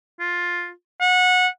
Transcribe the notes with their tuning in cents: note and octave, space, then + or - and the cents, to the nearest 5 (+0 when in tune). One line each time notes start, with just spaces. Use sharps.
F4 +10
F#5 -20